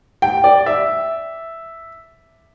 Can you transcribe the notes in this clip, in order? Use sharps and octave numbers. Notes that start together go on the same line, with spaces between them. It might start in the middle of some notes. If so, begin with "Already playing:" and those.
G5
D5
E5